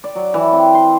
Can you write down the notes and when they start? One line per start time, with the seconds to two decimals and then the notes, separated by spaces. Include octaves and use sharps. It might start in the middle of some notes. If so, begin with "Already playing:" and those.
0.04 D5
0.15 F#3
0.34 E3
0.53 C4
0.75 C6